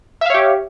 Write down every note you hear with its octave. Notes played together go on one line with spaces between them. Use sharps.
G4 C#5 E5 F5